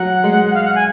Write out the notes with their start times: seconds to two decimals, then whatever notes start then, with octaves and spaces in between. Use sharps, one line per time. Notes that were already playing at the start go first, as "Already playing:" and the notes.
Already playing: F#3 F#5
0.24 G#3
0.45 F#5
0.54 F5
0.64 F#5
0.75 G#5